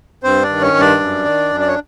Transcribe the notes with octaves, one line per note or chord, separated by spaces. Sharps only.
G2 C4 C5
D4 D5
D#3
C#4 C#5
G2
D4 D5
F#2
D#3
F#2
D5
C#5